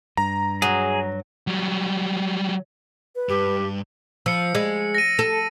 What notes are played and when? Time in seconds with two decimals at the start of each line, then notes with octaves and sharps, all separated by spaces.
0.17 G2 A#5
0.62 F#3 G#4
1.47 F#3 G3
3.16 B4
3.29 G2 G4
4.26 F3 E6 C#7
4.55 G#3
4.95 A#6 D#7
5.19 A4